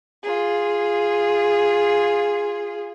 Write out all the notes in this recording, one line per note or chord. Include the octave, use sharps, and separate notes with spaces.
F4 G#4